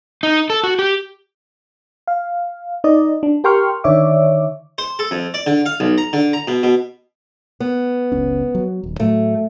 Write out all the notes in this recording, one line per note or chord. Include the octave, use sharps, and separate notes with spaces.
D#4
A4
F#4
G4
F5
D#4 D5 D#5
D4
G4 A#4 G5 C6 C#6 F6
D3 D#3 C#5 D5 E5 D6
C5
A4
F2
D5
D3
F5
B1
A#5
D3
A#5
B2
B2
B3
F#1 C#2 C#4
F#3
D#1
A2 F#3 A3